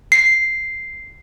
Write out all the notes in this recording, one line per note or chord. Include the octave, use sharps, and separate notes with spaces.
C7